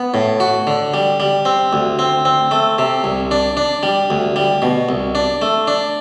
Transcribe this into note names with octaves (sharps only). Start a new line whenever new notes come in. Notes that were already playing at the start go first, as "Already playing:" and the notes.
Already playing: B3
A2
F#4
D3
G3
G3
C4
D2
C4
C4
A3
C3
C2
D4
D4
G3
D2
G3
B2
C2
D4
A3
D4